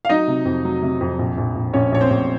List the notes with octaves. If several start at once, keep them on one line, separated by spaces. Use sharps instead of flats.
F5
F#3 D#4 D#5
C3
F2
F#3
C3
F2
A#1
A#1
A#1
A#1 C#4 C#5
A#1 C#5
C4 C5
A#1